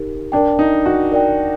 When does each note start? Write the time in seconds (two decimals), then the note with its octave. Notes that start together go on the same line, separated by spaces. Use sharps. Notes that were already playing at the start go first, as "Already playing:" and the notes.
Already playing: D#4 G4 A#4
0.32 D4 A#4 D5 G5
0.59 D#4
0.86 F#4
1.12 A#4 D5 G5